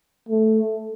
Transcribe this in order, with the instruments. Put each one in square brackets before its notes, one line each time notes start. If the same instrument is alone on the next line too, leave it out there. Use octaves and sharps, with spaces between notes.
[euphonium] A3